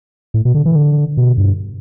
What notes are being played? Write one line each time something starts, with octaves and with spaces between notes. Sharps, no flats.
A2
B2
D3
E3
D3
B2
G2